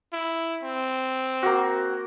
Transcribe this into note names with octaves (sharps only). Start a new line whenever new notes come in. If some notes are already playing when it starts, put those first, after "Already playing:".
E4
C4
A#3 F#4